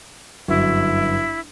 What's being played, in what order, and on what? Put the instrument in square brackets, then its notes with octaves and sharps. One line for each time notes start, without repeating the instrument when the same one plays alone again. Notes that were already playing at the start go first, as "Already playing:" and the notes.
[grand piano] G1 F#2 F#4 [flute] E4